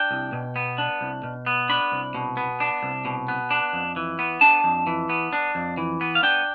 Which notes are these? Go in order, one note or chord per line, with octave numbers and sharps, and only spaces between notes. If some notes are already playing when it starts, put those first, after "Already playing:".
Already playing: D4 G5
C2
B2
B3
D4
C2
B2
B3
D4 B5
C2
B2
B3
D4
C2
B2
B3
D4
F2
E3
B3
D4 A5
F2
E3
B3
D4
F2
E3
B3
F5
D4 G5